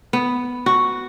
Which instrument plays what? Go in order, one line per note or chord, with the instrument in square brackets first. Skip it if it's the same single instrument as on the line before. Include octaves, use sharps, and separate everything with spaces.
[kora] B3
F#4